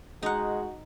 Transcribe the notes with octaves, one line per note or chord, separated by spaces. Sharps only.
G#3 D#4 F#4 F#5